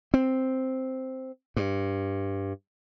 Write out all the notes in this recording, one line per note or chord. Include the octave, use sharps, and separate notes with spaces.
C4
G2